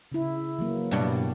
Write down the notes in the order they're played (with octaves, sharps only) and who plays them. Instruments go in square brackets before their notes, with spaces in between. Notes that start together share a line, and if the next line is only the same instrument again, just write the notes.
[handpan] C#3 E4
E3 F#3 A#3
[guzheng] G2 B2 [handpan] G3 D5